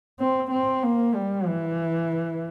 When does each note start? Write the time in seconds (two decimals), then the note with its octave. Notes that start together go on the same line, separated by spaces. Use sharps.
0.20 C4
0.51 C4
0.83 A#3
1.15 G3
1.47 E3